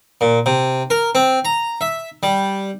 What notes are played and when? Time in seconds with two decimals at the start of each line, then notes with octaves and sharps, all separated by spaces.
0.21 A#2
0.46 C3
0.90 A#4
1.15 C4
1.45 A#5
1.81 E5
2.23 G3